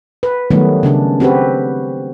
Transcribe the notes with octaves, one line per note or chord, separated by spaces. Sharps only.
B4
D#3 F#3 G3 A3 B3
C#3 C#4 D4
C4 F#4 G4 B4